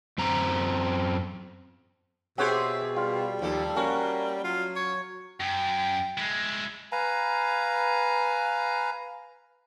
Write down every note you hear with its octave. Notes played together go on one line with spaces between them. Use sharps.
F#2 C4 A#5
B2 C4 G4 G#4 C5 C#5 E5 F#5
G3 F4
D#2 F3 A4
A#3 C#4 F#4
F#3 F4
C#5
F#2 G5
G#3 E4
B4 F5 G#5 A#5